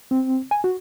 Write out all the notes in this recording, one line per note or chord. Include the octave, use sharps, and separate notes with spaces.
C4
G#5
F#4